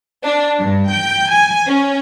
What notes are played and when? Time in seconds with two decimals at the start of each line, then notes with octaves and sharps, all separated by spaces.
0.24 D4
0.58 G2
0.90 G5
1.29 G#5
1.67 C#4